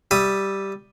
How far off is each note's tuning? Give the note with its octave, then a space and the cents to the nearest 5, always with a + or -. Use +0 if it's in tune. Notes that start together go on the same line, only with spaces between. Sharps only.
G3 +0 E5 +0 D#6 +0